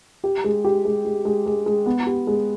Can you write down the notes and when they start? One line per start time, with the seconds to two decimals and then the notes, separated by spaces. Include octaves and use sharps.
0.24 G4
0.44 G#3
0.65 G4
0.85 G#3
1.05 G#3
1.25 G#3
1.46 G#3
1.66 G#3
1.86 B3
2.06 G4
2.27 G#3